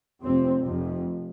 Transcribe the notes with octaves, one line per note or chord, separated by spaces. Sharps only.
F1 F2 C3 C4
F1 F2 C3